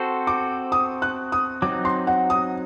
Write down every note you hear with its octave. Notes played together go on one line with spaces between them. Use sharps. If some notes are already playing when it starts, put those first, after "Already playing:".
Already playing: C4 F#4 A4 C5
D6
D#6
F#6
D#6
F#3 C4 D#4 D6
C6
F#5
D#6